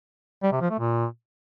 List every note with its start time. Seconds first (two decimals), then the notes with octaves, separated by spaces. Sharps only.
0.43 G3
0.52 C3
0.61 F3
0.70 A3
0.79 A#2